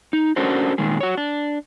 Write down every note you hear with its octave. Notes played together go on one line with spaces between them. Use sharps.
D#4
C#4 D4 F#4 A4 A#4 C5
A#2 D#3 G#3 G#4
F#4 C#5
D4